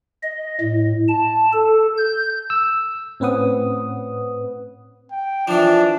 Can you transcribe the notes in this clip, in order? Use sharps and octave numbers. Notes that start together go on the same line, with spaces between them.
D#5
A2
A5
A4
G6
E6
A2 C4 C#4 B4 F#5 D#6
G5
E3 F3 D4